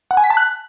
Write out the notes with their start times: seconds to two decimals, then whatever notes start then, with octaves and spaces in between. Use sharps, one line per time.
0.11 F#5
0.17 G#5
0.24 B6
0.30 A5
0.37 F#6